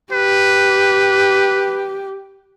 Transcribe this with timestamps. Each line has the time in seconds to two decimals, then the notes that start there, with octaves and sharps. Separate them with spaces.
0.13 G4 B4